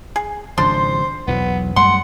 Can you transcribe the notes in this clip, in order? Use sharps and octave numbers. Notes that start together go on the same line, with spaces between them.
G#4
G#1 C#3 F3 D4 C5 C6
B1 E2 F#3 B3
F#2 G3 A3 F#5 C6